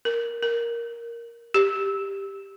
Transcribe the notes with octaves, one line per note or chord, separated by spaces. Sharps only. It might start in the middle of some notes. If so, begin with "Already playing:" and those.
A#4
A#4
G4